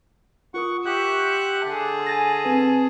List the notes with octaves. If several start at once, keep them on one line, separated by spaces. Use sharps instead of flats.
F4 A#4 F#5 C#6 D#6
G4 E5 F#5 C#6 F#6 G6
C6 D6 G6
D3 G#4 A5
G#5 A6 A#6
C4 B4